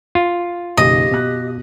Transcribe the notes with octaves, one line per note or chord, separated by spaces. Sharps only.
F4
F#1 B1 D#3 G4 D#5
B2 F#6